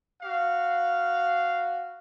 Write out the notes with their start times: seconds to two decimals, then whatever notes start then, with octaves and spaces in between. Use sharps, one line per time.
0.22 F#4 F5